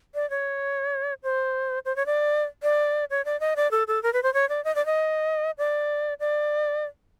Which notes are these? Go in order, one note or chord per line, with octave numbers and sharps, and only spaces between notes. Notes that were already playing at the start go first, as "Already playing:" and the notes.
D5
C#5
C5
C5
C#5
D5
D5
C#5
D5
D#5
D5
A4
A4
A#4
B4
C5
C#5
D5
D#5
D5
D#5
D5
D5